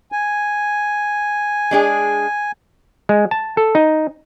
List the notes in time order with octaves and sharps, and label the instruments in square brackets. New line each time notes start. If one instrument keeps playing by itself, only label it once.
[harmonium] G#5
[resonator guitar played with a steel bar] G#3 D4 G#4
[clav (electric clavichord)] G#3
A5
A4
D#4